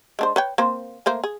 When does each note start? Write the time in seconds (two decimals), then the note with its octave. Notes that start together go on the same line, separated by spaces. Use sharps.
0.19 G#3 D4 C5
0.36 B4 C#5 G5
0.58 A#3 C4 C5
1.06 A3 A#3 C5
1.24 G#4